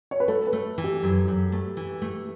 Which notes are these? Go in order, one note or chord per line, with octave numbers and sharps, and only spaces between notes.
C#5
B4
A3 A4
B4
A3
E3
G4
F#2
F#2
A3
E3
A3